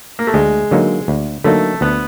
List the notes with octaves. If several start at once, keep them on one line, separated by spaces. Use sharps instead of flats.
A#3
A3
D2 G#3
D3 F#3 A#3 D#4
D2
D3 F#3 A3 A#3 D#4
D2 B3